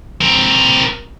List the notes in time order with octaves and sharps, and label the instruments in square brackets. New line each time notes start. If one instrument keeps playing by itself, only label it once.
[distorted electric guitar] C4 A#4